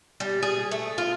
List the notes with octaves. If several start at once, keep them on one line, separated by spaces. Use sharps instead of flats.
G3
G#4
A3
F4